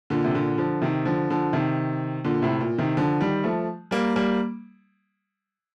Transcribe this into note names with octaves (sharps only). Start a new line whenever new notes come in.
A#2 D3
C3
A#2 D3
D3 F3
C3 D#3
D3 F3
D3 F3
C3 D#3
A#2 D3
A2 C3
A#2
C3 D#3
D3 F3
D#3 G3
F3 A3
G3 A#3
G3 A#3